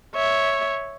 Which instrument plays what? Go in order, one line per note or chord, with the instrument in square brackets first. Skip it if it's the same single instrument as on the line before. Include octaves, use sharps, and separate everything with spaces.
[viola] C#5 E5